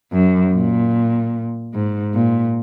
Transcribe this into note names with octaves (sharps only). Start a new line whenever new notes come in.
F#2
A#2
G#2
A#2